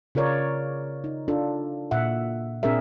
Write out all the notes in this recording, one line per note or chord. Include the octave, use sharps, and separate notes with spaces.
C#3 F4 A#4 C#5 D5
D#4
D4 F4 A4
A#2 E5 F#5
A#2 C4 D4 G#4 A#4 E5